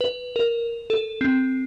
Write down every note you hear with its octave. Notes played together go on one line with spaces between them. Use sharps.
B4
A#4
A4
C4